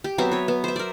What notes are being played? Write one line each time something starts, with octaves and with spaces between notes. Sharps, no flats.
G4
F#3 B3 C4 E5
B4 C#5
B3
C5 E5
A#4 D5